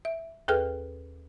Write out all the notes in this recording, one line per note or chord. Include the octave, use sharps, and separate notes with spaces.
E5
D#2 G#4 A4 B4 G5 F6